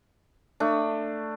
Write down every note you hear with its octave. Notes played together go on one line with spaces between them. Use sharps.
A3 D4